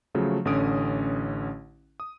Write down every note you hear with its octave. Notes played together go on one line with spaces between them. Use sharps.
C#3 F3 F#3 A3
A1 D3 C#4 D#6 D7
D#6